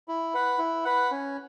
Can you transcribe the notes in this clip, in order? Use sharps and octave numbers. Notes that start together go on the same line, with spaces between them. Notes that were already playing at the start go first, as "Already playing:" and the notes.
E4
B4 F#5
E4
B4 F#5
C#4